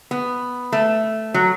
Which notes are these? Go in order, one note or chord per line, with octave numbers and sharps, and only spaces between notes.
B3
A3
F#3